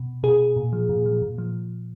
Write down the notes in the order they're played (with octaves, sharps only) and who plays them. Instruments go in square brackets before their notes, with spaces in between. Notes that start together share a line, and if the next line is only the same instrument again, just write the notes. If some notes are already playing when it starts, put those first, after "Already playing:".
Already playing: [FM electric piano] B2
B2 G#4
A#2
F3
A#2
F3
A#2
F3